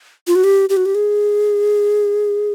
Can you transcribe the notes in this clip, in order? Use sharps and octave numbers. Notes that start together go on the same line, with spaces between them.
F4
F#4
G4
G4
F#4
G4
G#4